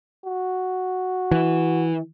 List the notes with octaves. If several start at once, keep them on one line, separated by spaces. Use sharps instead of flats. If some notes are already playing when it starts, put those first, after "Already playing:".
F#4
E3